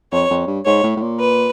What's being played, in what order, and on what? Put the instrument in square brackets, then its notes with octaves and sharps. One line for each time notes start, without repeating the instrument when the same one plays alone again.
[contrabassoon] F2 [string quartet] C#5
[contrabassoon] F2
G2
[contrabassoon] G#2 [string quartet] C#5
[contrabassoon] A2
A2
A#2
[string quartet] B4